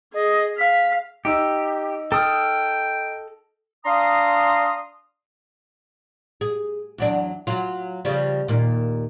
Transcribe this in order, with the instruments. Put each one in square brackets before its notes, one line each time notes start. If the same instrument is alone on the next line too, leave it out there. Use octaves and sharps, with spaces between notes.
[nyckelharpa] G#4 [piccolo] D#5
[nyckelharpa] F5 [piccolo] B6
[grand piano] D#4 E6 [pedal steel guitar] G4
[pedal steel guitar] A4 D#6 F6 [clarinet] G5
[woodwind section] D4 F5 A#5 C6 D#6
[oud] G#4
E2 F#3 D4
F#3 F4
C#3 F3 G3
D#2 A#2